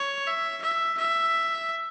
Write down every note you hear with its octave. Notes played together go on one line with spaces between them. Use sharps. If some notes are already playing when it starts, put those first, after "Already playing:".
Already playing: C#5
E5
E5
E5